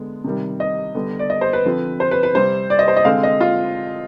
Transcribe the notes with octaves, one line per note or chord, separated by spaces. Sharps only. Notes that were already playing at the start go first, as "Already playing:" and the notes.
Already playing: D3 G#3 B3
C3 D#3 G3
D#5
D3 G3 B3
D5
D#5
C5
B4
D3 F3 C4
C5
B4
B4
C3 G3 C4 C5
D5
D#5
C5
D#5
D3 G#3 C4 F5
D#5
F4